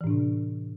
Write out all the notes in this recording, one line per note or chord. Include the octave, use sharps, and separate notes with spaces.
A2 C3 E3 D4